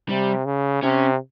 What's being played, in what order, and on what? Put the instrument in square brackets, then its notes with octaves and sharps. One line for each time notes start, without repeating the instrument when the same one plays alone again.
[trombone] C3 [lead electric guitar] G3
[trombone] C#3
[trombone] C3 [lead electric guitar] C#4